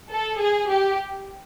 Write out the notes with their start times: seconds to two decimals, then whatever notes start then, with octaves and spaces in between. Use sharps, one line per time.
0.11 A4
0.39 G#4
0.69 G4